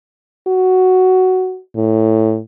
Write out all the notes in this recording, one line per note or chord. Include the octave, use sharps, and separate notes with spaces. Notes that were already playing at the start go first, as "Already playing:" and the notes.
F#4
A2